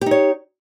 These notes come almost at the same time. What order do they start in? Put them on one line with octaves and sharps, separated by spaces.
G4 D#4 C#5